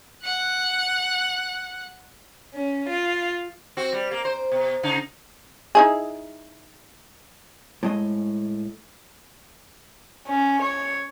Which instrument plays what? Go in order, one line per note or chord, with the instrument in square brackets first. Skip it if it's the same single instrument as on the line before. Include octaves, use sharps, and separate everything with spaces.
[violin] F#5 F#6
[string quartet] C#4
F4
[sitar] C4 F#4
G3
A#3
C5
B2
C#3 D#4
[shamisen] D#4 E4 G#4
[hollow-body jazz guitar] A2 G#3 D#5
[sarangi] C#4
C#5